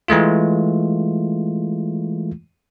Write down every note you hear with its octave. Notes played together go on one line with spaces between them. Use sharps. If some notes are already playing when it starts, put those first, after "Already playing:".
E3 G#3 A3 F4